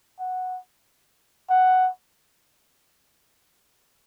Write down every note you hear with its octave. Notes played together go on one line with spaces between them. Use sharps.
F#5
F#5